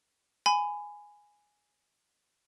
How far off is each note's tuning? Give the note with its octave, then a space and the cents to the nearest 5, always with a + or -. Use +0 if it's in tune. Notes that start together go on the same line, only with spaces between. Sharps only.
G#5 +0 B5 +25